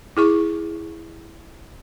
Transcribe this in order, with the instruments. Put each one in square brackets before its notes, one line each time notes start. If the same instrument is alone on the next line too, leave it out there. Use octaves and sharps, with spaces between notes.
[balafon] E4 G#4 C#6